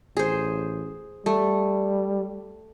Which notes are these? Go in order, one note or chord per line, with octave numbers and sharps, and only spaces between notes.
A1 G#4 C5
G3 A3